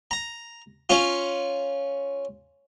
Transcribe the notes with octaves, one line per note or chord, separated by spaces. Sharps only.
A#5
C#4 F4